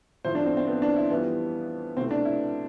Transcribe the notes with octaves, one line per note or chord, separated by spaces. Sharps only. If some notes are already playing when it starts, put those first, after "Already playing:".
A2 F3 A3 C5
D4
C4
C4
B3
D4
E4
F2 E3 G3 B3
C2 B2 A3 C4
D4
E4